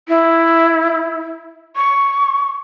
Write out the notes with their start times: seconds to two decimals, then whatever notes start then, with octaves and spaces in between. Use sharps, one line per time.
0.09 E4
1.76 C#6